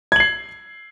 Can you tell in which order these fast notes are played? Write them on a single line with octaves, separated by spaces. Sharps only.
G#6 F#7 C7